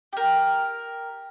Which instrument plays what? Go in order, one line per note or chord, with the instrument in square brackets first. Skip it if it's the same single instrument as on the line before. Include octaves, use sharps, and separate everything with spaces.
[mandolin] G4 A#4